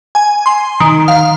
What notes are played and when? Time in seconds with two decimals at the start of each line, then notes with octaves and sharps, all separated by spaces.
0.15 G#5
0.46 C6
0.80 D#3
1.08 F5